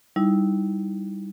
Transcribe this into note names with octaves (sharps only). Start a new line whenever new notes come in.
G3 D#4 E4